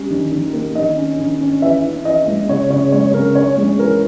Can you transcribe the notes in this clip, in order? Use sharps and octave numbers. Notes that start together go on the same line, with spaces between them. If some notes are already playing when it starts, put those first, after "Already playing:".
Already playing: G3 C#4
D#3
D#3
A#3
D#3 D#5
C#4
D#3
C#4
E3 E5
C#4
E3 D#5
G#3
C#3 C#5
C#3 C#5
G#3 C#5
C#3 A#4
C#4 C#5
G#3
E3 A#4